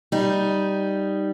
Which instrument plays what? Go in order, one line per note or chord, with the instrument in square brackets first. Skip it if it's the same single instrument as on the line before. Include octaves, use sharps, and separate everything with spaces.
[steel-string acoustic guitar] G3 D#4